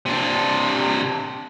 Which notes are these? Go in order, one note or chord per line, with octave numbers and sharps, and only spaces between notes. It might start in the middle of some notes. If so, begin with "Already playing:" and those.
C3 D4